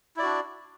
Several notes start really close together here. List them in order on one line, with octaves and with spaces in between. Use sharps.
E4 D5 F#4 D4